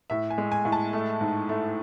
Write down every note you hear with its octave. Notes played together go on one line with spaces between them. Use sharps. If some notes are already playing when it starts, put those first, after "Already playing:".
A2 E5
G#5
G#3
G#5
A2
A5
A3
G#2
A3